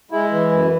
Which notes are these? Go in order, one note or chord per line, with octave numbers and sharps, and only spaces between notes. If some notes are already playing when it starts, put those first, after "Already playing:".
G#3 E4
E3
F#2